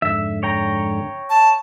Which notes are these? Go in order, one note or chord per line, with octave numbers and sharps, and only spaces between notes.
F2 G#2 D3 E5
C#5 G5 A#5
A5